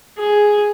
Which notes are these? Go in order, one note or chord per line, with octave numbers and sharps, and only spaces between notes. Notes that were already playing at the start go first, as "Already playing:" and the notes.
G#4